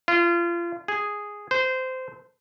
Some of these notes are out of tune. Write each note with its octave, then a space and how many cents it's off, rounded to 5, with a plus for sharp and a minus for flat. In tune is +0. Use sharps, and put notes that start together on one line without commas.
F4 -30
G#4 -5
C5 -20